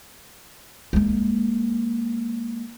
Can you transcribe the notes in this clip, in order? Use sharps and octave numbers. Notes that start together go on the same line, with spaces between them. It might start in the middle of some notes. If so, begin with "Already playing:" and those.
G#3 A#3